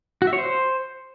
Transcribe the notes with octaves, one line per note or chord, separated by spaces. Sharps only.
F#4
E5
C#5
C5